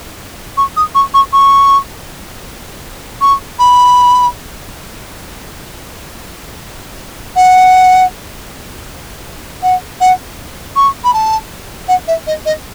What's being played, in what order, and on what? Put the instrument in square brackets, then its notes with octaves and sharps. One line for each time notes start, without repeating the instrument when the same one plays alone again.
[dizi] C#6
D#6
C#6
C#6
C#6
C#6
B5
F#5
F#5
F#5
C#6
B5
A5
F#5
E5
D#5
D#5